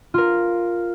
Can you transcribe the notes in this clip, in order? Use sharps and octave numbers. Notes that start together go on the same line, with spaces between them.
F4 A#4